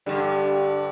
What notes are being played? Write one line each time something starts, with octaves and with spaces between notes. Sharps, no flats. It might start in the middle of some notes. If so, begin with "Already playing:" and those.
G2 D3 G3